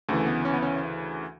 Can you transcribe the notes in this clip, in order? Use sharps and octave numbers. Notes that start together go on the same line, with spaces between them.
D2 C#3 E3 A3
B3
C#4
B3
C#4